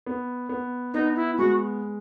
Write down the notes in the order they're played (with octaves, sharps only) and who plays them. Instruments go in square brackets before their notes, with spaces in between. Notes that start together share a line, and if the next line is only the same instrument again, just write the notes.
[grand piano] B3
B3
[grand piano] B3 [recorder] D#4
[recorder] E4
[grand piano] G#3 [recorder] F#4